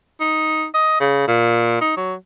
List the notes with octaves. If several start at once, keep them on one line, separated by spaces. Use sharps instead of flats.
D#4
D#5
C#3
A#2
D#4
F#3